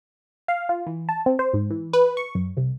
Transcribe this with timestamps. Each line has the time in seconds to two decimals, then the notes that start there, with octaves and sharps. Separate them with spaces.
0.48 F5
0.69 F4
0.87 E3
1.09 A5
1.26 C4
1.39 C5
1.54 G#2
1.70 E3
1.93 B4
2.17 C#6
2.35 F#2
2.57 C2